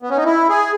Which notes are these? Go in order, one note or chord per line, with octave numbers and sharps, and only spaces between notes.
B3
C#4
D#4
E4
G#4